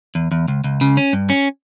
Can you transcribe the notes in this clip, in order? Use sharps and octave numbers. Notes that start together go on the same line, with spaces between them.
E2
E2
C#2
C#2
C#3
C#4
G2
C#4